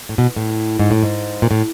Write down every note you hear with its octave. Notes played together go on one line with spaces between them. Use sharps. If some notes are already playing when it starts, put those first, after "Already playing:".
A2
B2
A2
G#2
A2
G#2
A#2
A2